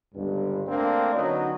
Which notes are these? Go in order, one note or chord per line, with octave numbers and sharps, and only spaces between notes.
G1 C#2 G2
A3 A#3 C4 D4
D3 F#3 B3 C#4 D#4